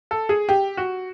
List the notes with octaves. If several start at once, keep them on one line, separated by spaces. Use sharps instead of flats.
A4
G#4
G4
F#4